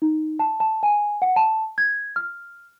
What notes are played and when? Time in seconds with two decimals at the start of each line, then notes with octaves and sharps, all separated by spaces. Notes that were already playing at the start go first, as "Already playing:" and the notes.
0.02 D#4
0.39 A5
0.60 A5
0.83 G#5
1.22 F#5
1.36 A5
1.78 G#6
2.16 F6